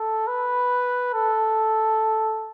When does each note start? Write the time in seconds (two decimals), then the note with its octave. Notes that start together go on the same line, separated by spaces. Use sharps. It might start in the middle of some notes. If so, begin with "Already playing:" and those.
Already playing: A4
0.27 B4
1.14 A4